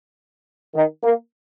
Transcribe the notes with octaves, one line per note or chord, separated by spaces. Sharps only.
D#3
A#3